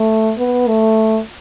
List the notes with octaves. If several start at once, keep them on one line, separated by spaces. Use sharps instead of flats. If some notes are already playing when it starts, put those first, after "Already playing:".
Already playing: A3
B3
A3